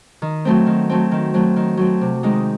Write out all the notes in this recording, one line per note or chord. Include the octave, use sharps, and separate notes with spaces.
D#3
F#3 A3 C4
D#3
F#3 A3 C4
D#3
F#3 A3 C4
D#3
F#3 A3 C4
C3
D#3 G#3 C4 D#4